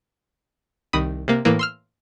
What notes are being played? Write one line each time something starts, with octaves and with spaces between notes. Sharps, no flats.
C2 D#3 B5 D#6
C3 A#3
A2 E3 A#3
C6 E6 F6